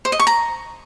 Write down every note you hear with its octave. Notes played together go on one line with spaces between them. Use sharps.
C5
D#5
C#6
A#5